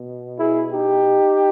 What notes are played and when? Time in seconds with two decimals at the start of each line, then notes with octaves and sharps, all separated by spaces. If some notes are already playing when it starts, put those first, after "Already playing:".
Already playing: B2
0.39 E4 G#4
0.72 D#4 G4